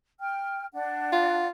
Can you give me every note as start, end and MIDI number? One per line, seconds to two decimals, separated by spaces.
0.19 0.66 79
0.19 0.66 89
0.73 1.47 62
0.73 1.47 78
1.12 1.48 65